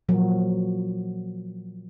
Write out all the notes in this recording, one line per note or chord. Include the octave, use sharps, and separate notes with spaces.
A#2 F3 F#3 F#4 A#4